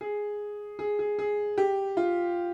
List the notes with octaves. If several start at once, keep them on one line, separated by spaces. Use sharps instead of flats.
G#4
G#4
G#4
G#4
G4
F4